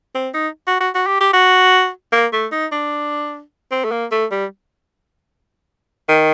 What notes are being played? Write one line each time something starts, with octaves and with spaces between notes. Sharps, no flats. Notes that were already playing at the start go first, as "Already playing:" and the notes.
C4
D#4
F#4
F#4
F#4
G4
G4
F#4
A#3
A3
D#4
D4
C4
A3
A#3
A3
G3
D#3